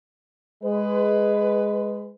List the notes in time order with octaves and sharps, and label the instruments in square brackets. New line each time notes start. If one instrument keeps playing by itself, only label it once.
[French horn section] G#3 B4